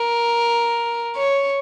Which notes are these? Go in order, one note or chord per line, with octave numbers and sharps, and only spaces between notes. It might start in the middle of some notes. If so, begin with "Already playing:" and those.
Already playing: A#4
C#5